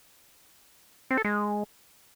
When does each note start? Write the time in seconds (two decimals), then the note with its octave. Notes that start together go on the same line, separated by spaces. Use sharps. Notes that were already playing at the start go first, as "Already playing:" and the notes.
1.11 C4
1.18 A4
1.25 G#3